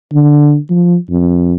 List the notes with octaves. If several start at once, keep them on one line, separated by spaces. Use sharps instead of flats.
D3
F3
F2